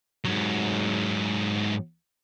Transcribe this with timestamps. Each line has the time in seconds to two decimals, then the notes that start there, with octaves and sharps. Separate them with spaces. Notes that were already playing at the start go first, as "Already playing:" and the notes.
0.25 G#2 F#3